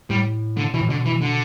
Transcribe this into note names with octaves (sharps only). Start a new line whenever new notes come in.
A2 G3
D3
B2 E3
A2
B2 D3
E3
D3